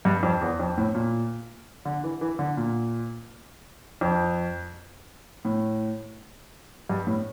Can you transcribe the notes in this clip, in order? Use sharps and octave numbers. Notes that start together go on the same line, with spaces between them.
G2
F2
E2
F2
A2
A#2
D3
E3
E3
D3
A#2
F2
A2
G2
A2